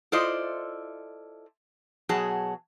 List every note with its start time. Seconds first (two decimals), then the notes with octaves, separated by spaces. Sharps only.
0.12 E4 F4 A4 C5 D5 D#5
2.09 B2 F#3 G#4 A5